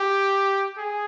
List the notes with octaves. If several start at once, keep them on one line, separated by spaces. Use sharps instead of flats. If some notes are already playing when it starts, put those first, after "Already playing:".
Already playing: G4
G#4